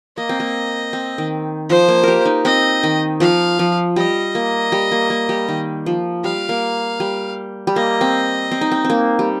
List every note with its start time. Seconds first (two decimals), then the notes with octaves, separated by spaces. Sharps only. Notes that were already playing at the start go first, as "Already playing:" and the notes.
0.17 A#3 D#5
0.29 C4
0.40 A#3
0.93 C4
1.18 D#3
1.69 F3 C5
1.88 A#3
2.03 G4 A#4
2.26 D#4
2.44 C4 D#5
2.83 D#3
3.20 F3 F5
3.59 F3
3.96 G3 D#5
4.35 A#3
4.72 G3
4.92 A#3
5.10 A#3
5.29 G3
5.49 D#3
5.86 F3
6.24 G3 F5
6.49 A#3
7.00 G3
7.67 G3
7.76 A#3 D#5
8.01 C4
8.52 C4
8.61 D#4
8.71 C4
8.84 C4
8.90 A#3
9.19 G3